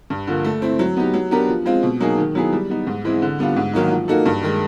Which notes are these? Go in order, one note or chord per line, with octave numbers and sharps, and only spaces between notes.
G2
D3 F3 A#3
A3
C4 E4
F#3
B3 D#4 G4
F#3
B3 D4 G4 A#4
F3
G#3 C4 F4
B2
F#3 A#3 D#4 G#4
D#3
F#3 B3 E4 G#4
G3
B3 D#4
G#2
E3 G#3 C4 E4
D3
G3 B3 D4 F4
G#2
D#3 F#3 A#3 D#4
F3
A#3 D#4 F#4 A4
G2
D#3 G#3